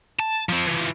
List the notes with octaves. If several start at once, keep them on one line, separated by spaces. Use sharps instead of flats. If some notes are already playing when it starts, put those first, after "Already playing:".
A5
F3 C4
E3 F3